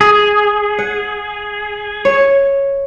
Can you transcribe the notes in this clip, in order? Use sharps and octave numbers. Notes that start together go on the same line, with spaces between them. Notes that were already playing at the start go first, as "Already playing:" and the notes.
G#4
F#5
C#5